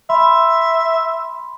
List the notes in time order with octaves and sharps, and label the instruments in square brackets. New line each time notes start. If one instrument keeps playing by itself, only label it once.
[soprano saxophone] E5 [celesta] B5 C6